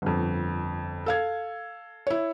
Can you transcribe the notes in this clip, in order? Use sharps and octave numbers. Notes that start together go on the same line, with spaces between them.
G1 F2
A4 F5 G#6
E4 C#5